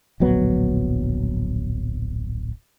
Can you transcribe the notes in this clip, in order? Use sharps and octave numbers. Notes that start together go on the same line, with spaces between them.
D1 A#1 F#3 B3